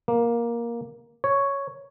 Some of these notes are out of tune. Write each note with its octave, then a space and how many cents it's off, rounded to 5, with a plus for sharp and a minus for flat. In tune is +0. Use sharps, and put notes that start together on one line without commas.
A#3 +10
C#5 +0